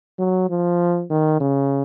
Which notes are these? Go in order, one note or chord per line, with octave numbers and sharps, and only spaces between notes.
F#3
F3
D#3
C#3